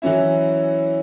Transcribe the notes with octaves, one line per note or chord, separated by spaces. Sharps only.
E3 F#3 C#4 E4